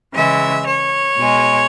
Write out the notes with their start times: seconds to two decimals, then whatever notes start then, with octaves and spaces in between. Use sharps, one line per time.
0.13 C#3 E3 G#3 E5
0.65 C#5
1.17 B2 G#3